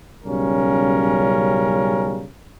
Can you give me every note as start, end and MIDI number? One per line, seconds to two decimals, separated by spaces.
0.24 2.26 35
0.24 2.26 49
0.24 2.26 55
0.24 2.26 61
0.24 2.26 70